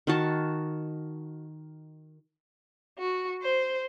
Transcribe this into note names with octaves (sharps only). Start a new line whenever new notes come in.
D#3 F#4 A5
F#4
C5